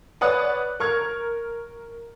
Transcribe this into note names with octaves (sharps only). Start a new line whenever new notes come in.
B4 C#5 D5 F#5 D#6 F#6
A#4 C#6 F6 G#6